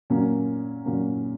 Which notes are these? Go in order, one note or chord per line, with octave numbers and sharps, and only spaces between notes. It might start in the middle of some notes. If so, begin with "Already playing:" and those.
A#2 F#3 A#3 C#4
A#2 F#3 A#3 C#4